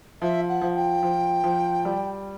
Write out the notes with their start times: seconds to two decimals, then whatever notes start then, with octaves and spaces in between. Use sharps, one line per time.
0.21 F3 E5
0.48 F#5
0.61 F3
0.75 G5
1.03 F3
1.44 F3
1.85 G3